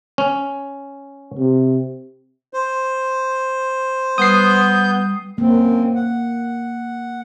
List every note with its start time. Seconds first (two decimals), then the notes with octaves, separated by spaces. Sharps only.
0.18 C#4
1.38 C3
2.53 C5
4.18 G3 B3 D#6 G6 C7
5.38 F#2 A#3 C4
5.95 F#5